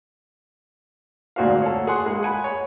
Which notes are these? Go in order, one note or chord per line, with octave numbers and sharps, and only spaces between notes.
G#1 D2 A#2 F#4 C5 F5
A4 C#5
G#4 F#5 C6
A#1 G#3 G#4
F#5 G#5 B5
C#5